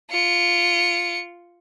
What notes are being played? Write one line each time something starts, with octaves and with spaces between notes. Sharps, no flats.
F4 C#7